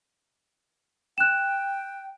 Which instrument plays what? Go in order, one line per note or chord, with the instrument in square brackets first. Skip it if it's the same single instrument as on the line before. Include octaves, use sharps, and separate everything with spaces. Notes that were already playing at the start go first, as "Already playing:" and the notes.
[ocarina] G5 [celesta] F#6 E7